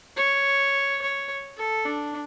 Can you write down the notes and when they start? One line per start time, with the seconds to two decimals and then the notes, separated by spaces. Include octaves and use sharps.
0.17 C#5
1.02 C#5
1.57 A4
1.86 D4